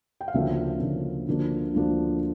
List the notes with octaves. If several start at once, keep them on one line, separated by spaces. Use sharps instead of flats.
G5
F5
D2 C#3 F3 A#3 D4 E5
D2 C#3 F3 A#3 D4
D2 D3 F3 A#3 D4
D2 D3 F3 A#3 D4